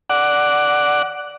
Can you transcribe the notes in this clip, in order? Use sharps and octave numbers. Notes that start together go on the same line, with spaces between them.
D5 F#5